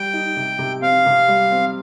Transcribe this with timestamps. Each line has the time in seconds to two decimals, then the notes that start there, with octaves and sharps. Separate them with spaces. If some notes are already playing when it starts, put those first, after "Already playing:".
Already playing: G3 G5
0.14 D#4
0.36 C3
0.59 C3
0.82 C4 F5
1.06 C3
1.28 G3
1.51 C4